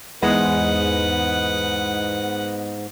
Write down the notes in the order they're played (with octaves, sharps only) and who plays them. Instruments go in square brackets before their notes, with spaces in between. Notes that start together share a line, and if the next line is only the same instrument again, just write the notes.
[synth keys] E2 G#3 [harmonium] G#2 [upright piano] B3 D#4 [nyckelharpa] B4 F#5